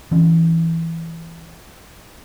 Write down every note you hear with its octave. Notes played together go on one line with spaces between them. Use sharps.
E3 C#4